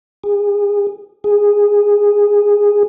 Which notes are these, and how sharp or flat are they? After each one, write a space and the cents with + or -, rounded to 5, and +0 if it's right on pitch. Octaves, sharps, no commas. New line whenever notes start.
G#4 -30
G#4 -10